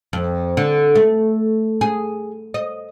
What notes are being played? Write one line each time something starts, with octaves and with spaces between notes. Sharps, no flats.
F2
D3
A3
G#4
D#5